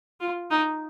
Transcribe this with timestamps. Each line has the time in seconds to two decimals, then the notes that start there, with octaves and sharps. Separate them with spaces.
0.20 F4
0.51 D#4